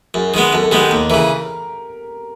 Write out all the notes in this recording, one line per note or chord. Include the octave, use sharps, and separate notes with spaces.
F#2 G#4
D#3 G#3 B3 G#4
F#2 A4
A4
D#3 G#3 B3 G4
G4
D#2 A#4
C#3 E3 A#4